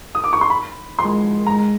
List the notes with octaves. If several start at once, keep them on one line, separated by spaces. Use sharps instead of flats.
D#6
D6
C#6
C6
B5
G#3 C6
G#3 A#5